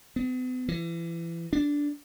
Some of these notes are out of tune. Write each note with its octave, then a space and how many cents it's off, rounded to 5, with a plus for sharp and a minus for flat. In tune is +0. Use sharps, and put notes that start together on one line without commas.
B3 +45
E3 +30
D4 -10